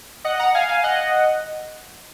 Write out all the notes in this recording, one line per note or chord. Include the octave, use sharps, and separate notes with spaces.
D#5 F#5
F#5 A#5
F5 G#5
F5 G#5
D#5 F#5